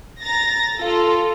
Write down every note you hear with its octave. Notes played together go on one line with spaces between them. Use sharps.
A#5 A6 A#6
F4 A4